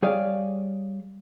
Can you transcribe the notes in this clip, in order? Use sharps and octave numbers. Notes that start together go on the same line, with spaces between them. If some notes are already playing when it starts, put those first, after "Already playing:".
G3 G#4 C#5 D5 F5